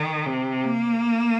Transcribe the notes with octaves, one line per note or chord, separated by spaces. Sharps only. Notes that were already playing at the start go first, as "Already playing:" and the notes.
Already playing: D#3
C3
A#3